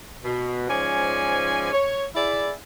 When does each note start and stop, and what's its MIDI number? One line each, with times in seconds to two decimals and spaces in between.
0.24 0.64 47
0.68 1.72 44
0.68 1.72 53
0.68 1.72 61
0.68 1.72 74
0.68 1.72 80
1.72 2.04 73
2.14 2.50 64
2.14 2.50 68
2.14 2.50 74